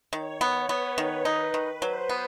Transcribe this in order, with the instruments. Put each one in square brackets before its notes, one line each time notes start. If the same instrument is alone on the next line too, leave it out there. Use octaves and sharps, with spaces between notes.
[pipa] D#3 [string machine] C#5
[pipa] B3
[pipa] B3 [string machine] B4
[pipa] D#3
D#4
D#3
[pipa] F#3 [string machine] C5
[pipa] B3